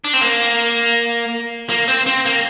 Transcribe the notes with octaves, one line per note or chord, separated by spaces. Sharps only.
D4
C4
A#3
A#3
C4
C4
A#3